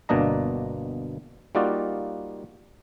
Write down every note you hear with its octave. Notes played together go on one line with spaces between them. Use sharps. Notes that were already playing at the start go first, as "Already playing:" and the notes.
G1 B2 A#3 D4 D#5 A#5
G3 A#3 D#4 F4 F#4 D5